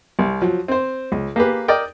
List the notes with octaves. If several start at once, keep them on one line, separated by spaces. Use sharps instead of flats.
C2
F3 F#3
C4 C5
C#2
A#3 G4 G#4 B4
A#4 D5 D#5 G5